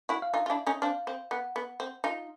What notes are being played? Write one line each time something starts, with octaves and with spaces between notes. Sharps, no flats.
E4 F#4
F5
D#4 F4 E5
F4
D4 E4
C#4 D#4
C4 D4 F5
C4
B3 F#5
B3
C4
D#4 F4